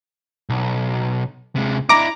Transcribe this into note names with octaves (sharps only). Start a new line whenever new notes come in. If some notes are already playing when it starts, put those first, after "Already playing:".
B1
C3 G#3
D4 E4 A#5 D6